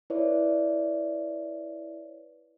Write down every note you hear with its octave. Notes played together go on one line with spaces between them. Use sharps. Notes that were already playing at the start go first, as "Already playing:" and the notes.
E4 B4 C#5 D5 E5